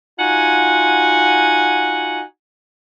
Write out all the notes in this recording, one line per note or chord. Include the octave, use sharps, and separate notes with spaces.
D#4 F4 F#4 F#5 G#5